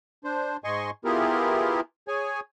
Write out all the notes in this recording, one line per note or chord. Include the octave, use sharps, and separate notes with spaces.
D4 C5
G#2 D#5 G#5 C6 C#6
B3 E4 F4 G4 G#4 A#4
G#4 C#5 G#5